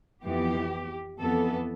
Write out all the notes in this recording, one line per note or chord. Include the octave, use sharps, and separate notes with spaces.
F2 E3 B3 G4
F2 E3 B3 A4